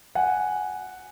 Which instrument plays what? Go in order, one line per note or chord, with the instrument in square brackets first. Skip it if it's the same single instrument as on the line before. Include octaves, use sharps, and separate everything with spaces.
[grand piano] F#5 G#5